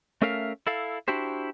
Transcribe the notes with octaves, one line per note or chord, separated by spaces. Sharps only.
A3 C#4 A4 A#4 E5 F5
E4 A4 F5
D4 E4 F#4 G4 C5